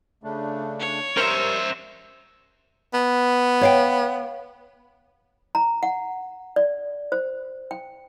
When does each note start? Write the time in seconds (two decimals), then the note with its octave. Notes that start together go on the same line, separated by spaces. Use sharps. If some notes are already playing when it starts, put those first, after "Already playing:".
0.23 C#3 A3 D4
0.80 C#5
1.17 G2 G3 C#4 A#4 C5 E5
2.93 B3
3.61 C#5 F5 G5
5.55 A#5
5.83 F#5
6.56 D5
7.12 C5
7.71 G5